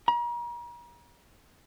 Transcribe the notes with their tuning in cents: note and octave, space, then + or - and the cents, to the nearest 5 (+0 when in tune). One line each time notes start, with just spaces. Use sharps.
A#5 +40